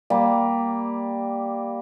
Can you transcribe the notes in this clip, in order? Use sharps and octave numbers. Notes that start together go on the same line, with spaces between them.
G3 A#3